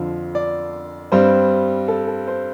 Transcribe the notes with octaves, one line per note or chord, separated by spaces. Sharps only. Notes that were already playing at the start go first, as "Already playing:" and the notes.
Already playing: F2 D3 F3
D5
G2 G3 C4 C5
A4
A4
C5